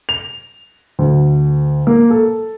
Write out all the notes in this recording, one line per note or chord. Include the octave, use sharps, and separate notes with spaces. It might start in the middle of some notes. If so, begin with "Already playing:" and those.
F7
D2
A#3
A4